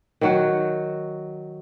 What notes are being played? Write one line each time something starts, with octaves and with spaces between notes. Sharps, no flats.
D#3 F#3 F#4